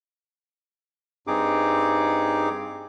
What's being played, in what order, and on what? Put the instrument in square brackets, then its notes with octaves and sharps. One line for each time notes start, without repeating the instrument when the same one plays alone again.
[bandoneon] G2 C4 D#4 G#4 D6